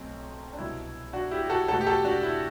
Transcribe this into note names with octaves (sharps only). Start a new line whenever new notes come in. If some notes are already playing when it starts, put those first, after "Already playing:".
Already playing: B1 F#3 A3 C4
D4
C2 B2 F#3 E4
D4 F#4
E4 G4
G4
F#4 A4
E2 B2 A3 F#4 A4
G4
F#4 A4
D4 F#4
E4